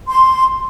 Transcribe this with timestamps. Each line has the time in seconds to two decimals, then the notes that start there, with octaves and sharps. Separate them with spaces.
0.07 C6